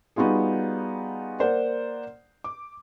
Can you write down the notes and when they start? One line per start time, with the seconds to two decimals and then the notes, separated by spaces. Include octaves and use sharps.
0.16 G3 B3 D#4 F4 F#4 G#4
1.40 A#3 C5 D5 F#5
2.44 D6